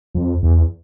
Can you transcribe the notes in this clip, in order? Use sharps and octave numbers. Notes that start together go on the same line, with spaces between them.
F2
E2